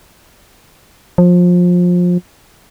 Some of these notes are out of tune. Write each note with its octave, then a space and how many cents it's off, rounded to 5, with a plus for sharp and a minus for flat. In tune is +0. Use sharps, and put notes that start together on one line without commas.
F3 +25